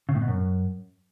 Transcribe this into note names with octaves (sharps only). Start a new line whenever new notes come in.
C#3
A2
B2
F#2